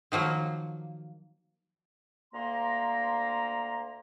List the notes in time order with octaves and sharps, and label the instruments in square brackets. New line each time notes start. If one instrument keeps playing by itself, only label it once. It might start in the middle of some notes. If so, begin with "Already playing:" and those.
[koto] D#3 F3 F#3 A#3
[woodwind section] D2 A#3 A#5 C6